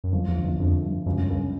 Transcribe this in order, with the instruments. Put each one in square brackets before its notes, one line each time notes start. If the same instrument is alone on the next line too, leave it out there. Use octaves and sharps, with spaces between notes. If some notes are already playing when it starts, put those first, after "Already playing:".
[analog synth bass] F#2
[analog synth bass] F2 [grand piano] F3
[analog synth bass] E2
[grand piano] G1
[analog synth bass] E2
[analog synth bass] F2 [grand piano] D3
[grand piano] G2
[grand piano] C#2 [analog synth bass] F#2
[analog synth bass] F#2
[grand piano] C#2 [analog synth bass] F#2